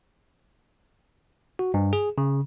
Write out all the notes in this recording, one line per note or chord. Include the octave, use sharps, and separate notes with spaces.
F#4
G2
G#4
C#3